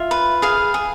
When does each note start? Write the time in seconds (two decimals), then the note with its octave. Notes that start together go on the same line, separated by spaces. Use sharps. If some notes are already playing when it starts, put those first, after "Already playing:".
Already playing: F4 E5
0.11 B4
0.42 G#4 F5
0.74 G#4